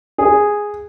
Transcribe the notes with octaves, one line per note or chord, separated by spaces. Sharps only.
G#4